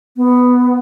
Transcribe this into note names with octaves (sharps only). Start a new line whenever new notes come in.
B3